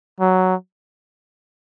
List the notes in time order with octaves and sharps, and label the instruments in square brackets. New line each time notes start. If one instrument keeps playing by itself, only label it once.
[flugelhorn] F#3